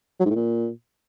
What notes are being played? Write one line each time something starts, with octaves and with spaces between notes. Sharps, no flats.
F#3
G#2
A2
A#2